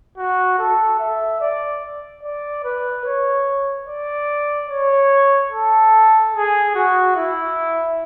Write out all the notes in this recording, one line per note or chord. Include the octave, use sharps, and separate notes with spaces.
F#4
A4
E5
D5
D5
B4
C#5
D5
C#5
A4
G#4
F#4
E4